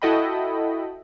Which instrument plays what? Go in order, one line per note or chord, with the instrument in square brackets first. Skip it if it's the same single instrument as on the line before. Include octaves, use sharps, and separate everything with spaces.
[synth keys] E4 F#4 A4 D#5 G5 B5